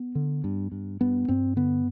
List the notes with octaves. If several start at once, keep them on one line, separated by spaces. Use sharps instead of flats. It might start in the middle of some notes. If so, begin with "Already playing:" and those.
Already playing: B3
D3
G2
G2
G2 B3
G2 C4
D3 B3